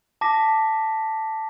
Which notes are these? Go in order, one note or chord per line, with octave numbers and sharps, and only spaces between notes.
A5 D6 A#6 B6